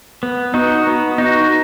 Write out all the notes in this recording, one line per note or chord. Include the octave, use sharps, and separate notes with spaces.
B3
D#4 F#4
B3
D#4 F#4